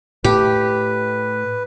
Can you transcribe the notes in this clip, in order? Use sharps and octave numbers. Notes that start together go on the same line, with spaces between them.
A2 A3 G4 B4